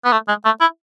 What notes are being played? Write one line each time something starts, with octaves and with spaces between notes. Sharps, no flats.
B3
A3
G#3
A3
E4